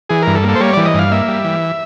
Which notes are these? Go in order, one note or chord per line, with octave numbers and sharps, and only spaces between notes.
E3 G#4
G2 A#4
A4
A#3
A4
C5
G3 C#5
E3 D5
D#5
G2 F5
A#3 E5
G3
E3